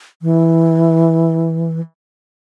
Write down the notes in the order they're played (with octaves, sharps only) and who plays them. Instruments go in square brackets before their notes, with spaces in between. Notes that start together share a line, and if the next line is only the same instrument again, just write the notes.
[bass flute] E3